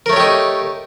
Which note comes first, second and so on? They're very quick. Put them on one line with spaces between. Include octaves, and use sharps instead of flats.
A#4 A3 C#5 G4 D#4